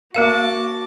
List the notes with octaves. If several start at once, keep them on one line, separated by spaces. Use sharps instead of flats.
A#3 F#4 A#4 F5 A5 D6